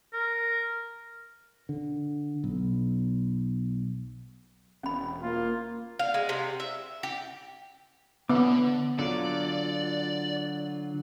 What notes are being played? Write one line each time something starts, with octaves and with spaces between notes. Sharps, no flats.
A#4
D3
B1
E1 C#4 B5
A#3 F4
F5
G#3
C3
E5
G4
D3 B3 D6
D3 F#3 F4 D5